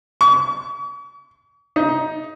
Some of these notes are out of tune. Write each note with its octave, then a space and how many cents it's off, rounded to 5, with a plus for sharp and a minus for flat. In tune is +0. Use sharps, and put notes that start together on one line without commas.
C#6 +45
D#4 +15